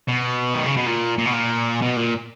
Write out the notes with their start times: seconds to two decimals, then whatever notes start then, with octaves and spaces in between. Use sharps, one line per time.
0.09 B2
0.54 D#3
0.66 C#3
0.77 B2
0.86 A#2
1.18 A#2
1.26 B2
1.33 A#2
1.82 B2
1.96 A#2